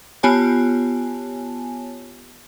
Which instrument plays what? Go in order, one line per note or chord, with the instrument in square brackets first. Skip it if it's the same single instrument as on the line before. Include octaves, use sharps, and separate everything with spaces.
[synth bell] B3 F4 G4 C#5 G#5 A5